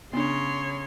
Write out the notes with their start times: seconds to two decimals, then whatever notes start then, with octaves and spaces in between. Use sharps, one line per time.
0.13 C#3 B3 D4 C#5 C6